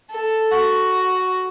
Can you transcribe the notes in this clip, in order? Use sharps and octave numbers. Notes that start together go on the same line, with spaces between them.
A4
F#4